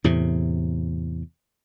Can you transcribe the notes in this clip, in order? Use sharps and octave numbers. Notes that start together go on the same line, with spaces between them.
E2 A2 C3